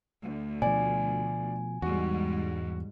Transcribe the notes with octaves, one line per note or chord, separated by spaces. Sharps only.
D2
B2 F3 D5 G#5
E2 G#2 G3 F#4